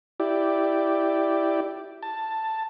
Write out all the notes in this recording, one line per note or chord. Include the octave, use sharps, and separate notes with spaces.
E4 G4 D5
A5